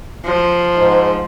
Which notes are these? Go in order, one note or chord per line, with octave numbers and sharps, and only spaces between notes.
F3
G#2